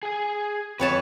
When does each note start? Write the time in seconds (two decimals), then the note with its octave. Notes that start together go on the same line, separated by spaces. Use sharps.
0.03 G#4 G#5
0.80 F2 B4 C#5 A5